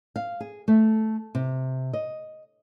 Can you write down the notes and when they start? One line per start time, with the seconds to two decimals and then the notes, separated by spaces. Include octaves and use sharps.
0.16 F5
0.40 G#4
0.68 A3
1.35 C3
1.93 D#5